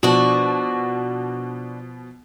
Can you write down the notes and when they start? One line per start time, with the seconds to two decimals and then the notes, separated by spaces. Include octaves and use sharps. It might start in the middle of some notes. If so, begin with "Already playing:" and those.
0.03 B2 F3 D4 F#4